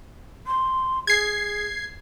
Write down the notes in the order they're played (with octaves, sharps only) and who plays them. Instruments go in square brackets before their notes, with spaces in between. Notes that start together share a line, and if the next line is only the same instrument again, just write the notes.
[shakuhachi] C6
[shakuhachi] G#4 [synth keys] G#6 C7